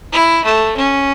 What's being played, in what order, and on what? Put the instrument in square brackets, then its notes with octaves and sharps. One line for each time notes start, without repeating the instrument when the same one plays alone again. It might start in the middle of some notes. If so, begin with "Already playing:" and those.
[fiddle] E4
A3
C#4